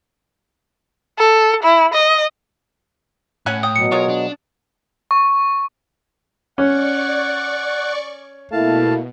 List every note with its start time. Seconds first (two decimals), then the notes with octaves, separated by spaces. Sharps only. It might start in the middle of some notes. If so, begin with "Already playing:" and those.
1.18 A4
1.63 E4
1.93 D#5
3.46 A2 C#4 F#5 G#5 F#6
3.63 G5 D#6
3.76 B2 F#3 C#7
3.92 G#3 F4 A#4 C#5
4.09 D4
5.11 C#6
6.58 C#4 D5 F#5 C#6
8.52 B2 A3 A#3 E4 F5 A5